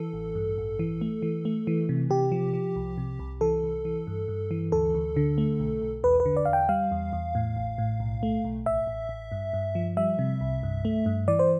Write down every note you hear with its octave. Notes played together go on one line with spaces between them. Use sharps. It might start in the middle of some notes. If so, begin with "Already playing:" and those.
Already playing: E3 A4
A1
G2
A1
E3
A3
E3
A3
E3
C3
C3 G4
F3
F3
C2
C3
C2
E3 A4
C2
E3
G2
G2
E3
D2 A4
D2
D3
A3
B1
B1
E2 B4
B4
D3
D5
F5
E2
G5
G3 F5
E2
E2
A2
A1
A2
B1
A3
B1
A1 E5
A1
A1
G2
G2
F3
G3 E5
C3
C2
G2
A3
G2
E3 D5
C5